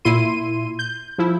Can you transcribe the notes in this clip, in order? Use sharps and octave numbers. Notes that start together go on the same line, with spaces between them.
A#2 E4 C6 D#7
G6
F3 E4